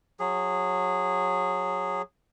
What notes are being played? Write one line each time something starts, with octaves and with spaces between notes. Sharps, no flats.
F#3 G#4